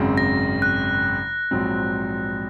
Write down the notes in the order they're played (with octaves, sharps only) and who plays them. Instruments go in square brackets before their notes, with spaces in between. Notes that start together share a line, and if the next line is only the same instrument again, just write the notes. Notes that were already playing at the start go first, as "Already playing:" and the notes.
Already playing: [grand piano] G#1 F#2 C#3 G#3 C4
[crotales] A#6
F#6
[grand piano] A#1 G#2 F#3 C4